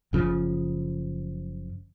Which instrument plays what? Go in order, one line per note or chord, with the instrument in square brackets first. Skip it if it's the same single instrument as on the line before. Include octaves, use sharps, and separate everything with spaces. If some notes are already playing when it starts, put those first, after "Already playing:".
[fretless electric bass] F#1 C#3 F3